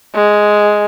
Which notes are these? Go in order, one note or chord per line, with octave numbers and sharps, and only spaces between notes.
G#3